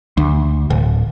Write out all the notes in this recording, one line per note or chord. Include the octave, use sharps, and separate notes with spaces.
D2
D1